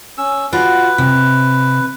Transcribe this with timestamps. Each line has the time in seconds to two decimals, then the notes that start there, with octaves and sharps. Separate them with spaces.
0.18 C#4 E6
0.52 F4 F#4 B4 D5
0.98 C3